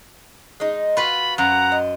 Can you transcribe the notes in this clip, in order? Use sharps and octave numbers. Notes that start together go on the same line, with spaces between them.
G#3 D#4
F4 F#4 B4 B5
F#2 F#5 A#5
D#5